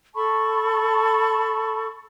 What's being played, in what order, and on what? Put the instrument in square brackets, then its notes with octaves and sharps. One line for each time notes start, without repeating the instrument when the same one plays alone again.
[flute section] A4 A5 B5 C#6